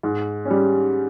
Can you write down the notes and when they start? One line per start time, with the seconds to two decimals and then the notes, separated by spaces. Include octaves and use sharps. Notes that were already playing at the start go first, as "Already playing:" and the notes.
0.03 G#2
0.45 C#4
0.51 G3